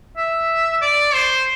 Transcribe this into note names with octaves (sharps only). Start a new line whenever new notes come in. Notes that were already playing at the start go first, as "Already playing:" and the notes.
E5
D5
C5